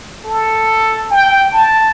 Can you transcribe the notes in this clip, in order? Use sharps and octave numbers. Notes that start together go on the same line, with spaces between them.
A4
G5
A5